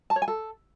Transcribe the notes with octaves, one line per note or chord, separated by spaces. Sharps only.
A5
C#5
G#5
A4